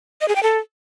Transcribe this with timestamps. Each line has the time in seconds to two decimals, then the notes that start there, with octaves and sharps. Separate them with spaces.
0.21 D#5
0.28 G#4
0.36 G5
0.43 A4